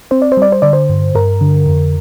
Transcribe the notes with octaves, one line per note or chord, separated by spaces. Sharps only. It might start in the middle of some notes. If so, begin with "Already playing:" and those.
C4 C5
D5
C5
G3 D5
C5
D3 D5
C5
G2
G2 A#4
D3
F2